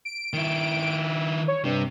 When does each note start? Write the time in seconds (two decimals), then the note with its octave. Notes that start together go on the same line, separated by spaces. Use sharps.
0.05 D7
0.33 D#3 E4
1.48 C#5
1.65 G2 C3